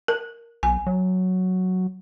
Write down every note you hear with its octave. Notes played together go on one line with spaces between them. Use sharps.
A#4
B1 G#5
F#3